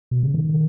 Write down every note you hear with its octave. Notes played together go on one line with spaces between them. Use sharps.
B2
C#3
D#3